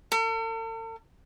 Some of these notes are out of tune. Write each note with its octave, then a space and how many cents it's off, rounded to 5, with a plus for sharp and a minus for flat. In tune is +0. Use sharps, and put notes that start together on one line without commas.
A4 +45